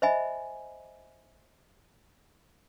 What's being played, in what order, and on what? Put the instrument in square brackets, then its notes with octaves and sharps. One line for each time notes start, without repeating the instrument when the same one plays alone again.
[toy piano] C5 D#5 E5 G#5 B5